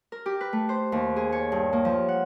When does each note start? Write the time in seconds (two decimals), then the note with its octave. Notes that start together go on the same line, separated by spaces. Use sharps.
0.12 A#4
0.26 G4
0.41 B4
0.53 A3
0.69 C5
0.92 D#2
1.16 G#4
1.32 C#5
1.52 G2
1.73 A#3
1.85 F3
2.08 F#5